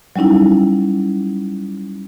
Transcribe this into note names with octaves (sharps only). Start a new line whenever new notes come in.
F#3 G3 C#4 D#4 E4